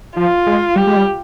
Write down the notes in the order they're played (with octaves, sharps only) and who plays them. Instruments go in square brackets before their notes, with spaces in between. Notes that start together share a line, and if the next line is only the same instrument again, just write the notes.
[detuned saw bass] F3 [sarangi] F4
[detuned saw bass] G#3
[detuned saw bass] G3 [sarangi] G4
[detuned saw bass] G#3
G3